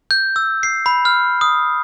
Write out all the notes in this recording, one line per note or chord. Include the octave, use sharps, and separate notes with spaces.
G6
E6
C7
B5
F6
D#6